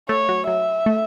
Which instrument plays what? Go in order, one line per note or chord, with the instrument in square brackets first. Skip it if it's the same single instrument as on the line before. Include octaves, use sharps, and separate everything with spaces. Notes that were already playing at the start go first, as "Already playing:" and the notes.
[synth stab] A3 [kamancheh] C#5
[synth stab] F#3
[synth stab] F#3 [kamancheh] E5
[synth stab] A3